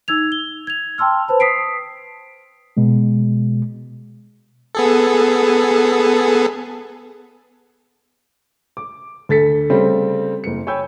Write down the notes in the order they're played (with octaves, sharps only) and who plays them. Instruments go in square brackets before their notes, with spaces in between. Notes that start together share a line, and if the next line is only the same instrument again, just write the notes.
[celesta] D#4 E6 G#6 F7
G7
G#6 F7
G5 A5 C6 E6 F6
B4 C5 A5 B5
D#6 B6 C7 D7
[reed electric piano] B2 G#3
[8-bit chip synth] B3 G#4 A4
[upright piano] D6
D2 A4 A6 B6 C#7
C#3 G3 A3 C4
F#1 C#7
C#5 G5 G#5 B5 E6 G6